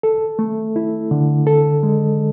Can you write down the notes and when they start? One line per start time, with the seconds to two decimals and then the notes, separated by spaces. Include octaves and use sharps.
0.03 A4
0.39 A3
0.76 E4
1.11 D3
1.47 A4
1.83 G#3